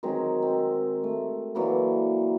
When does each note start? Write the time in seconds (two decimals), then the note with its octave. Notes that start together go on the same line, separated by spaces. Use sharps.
0.03 D#3 F#3 G#3 C4
0.42 C4
1.04 A3
1.55 D3 E3 F#3 A#3